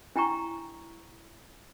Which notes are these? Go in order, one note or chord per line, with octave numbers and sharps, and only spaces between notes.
D4 E4 G5 A#5 C#6